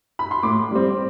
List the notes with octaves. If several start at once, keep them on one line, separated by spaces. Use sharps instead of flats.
B5
C6
A2 D6
G3 C4